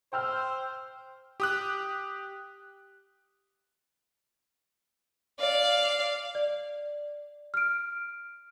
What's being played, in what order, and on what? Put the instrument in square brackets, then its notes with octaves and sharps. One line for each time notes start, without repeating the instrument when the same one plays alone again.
[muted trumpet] C5 [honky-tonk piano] G5 E6 F6
[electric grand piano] G4 D#6 F#6
[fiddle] D5 F5
[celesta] D5
F6 D7